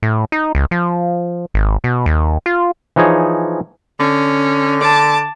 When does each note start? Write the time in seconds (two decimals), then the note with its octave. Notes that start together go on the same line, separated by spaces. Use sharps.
0.02 A2
0.32 D#4
0.55 C#2
0.71 F3
1.54 G#1
1.84 B2
2.06 D#2
2.46 F4
2.96 E3 F3 D#4 G#4 C#5
4.00 D3 C#4
4.81 A5 D6